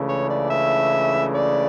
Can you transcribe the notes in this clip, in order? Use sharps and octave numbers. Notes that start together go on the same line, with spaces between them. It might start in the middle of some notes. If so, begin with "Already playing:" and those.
Already playing: C#2 C#3 E3 A3 D4
C#5
D5
E5
D5